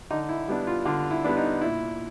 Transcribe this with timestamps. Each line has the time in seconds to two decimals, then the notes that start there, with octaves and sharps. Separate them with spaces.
0.11 D3 D#4
0.29 E4
0.48 G3 B3 D4
0.67 F4
0.85 D3 F4
1.11 E4
1.24 G3 B3 D4
1.37 D#4
1.61 A#2 E4